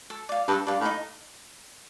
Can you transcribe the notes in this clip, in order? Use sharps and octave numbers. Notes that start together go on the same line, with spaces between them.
A4
D5 F5
G2 A4
G2 D5 F5
A2
D#4